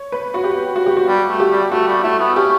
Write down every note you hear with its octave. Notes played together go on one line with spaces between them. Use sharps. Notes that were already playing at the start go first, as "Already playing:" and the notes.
Already playing: C#5
B4
F#4
G4
F#4
G4
F#4
G3 F#4
A3
G4
G3
A3 F#4
G3
A3 E4
B3
C#4 G4